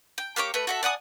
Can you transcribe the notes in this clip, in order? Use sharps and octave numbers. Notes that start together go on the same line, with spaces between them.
G5
A#3 G4 C#5 D6
A3 B4
F#4 A4 E5
D5 F#5 G#5 D#6